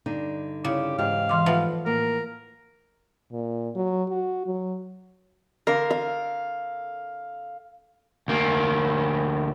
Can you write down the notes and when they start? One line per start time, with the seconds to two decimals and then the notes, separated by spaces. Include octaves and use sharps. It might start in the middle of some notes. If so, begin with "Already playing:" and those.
0.06 G2 D3 D#4
0.65 C#3 E4 G4
0.98 E2 G#2 G4 F5
1.29 E3 C6 D6
1.46 F3 A3 B3 F4 B4 E5
1.86 A2 A#3 A#4
3.32 A#2
3.75 F#3
4.09 F#4
4.47 F#3
5.67 D3 A#4 F5
5.90 F5
8.28 D2 A#3